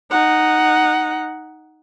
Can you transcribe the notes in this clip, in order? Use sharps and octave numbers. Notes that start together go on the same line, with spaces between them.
D#4 F#5